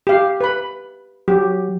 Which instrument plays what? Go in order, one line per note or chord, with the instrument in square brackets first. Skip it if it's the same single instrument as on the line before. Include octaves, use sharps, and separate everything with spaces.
[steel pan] G4 F5
B4 B5
[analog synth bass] F#3 [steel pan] G4